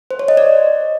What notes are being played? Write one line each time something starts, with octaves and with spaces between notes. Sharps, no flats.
C5
C#5
D#5
D5